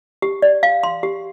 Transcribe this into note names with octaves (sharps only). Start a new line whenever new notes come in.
G4
D5
F5
C6
G4